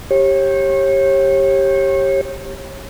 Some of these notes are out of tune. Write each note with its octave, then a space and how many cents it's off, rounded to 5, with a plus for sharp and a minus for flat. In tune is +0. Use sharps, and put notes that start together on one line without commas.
G4 +0 C#5 -30